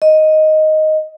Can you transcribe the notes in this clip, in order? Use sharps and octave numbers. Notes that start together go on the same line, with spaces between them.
D#5